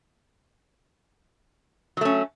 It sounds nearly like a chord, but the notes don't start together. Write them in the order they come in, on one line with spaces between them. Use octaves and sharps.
F#3 A3 C#4